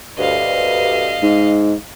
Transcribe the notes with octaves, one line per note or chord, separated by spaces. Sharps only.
D2 G2 D#5 F5
G#2